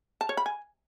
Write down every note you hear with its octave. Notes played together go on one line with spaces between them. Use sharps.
A5
C#5
B5
G#5